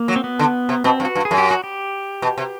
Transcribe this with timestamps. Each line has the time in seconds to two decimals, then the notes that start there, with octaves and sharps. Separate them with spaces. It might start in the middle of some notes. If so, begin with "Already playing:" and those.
Already playing: A#3
0.08 F#3
0.16 C4
0.24 B3
0.39 D3
0.69 C3
0.84 B2 C4
1.00 G2
1.05 F#4
1.15 G2
1.25 G#4
1.31 F#2
1.38 G4
1.51 F#4
1.64 G4
2.22 B2
2.38 C3